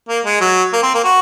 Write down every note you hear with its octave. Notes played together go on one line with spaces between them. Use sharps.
A#3
G#3
F#3
A#3
C4
A#3
F#4